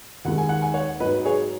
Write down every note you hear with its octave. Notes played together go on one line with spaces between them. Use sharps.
D#2 D#3 G#3 F#5
G#5
F#5
G#5
C#5 F#5
G#2 F#3 B4 D#5
G#4 C#5